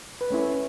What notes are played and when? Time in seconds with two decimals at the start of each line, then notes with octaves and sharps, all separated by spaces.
0.21 B4
0.30 A3 C#4 E4 C#5